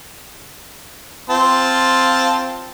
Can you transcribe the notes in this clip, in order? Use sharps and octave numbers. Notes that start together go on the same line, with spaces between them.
C4 F4 A5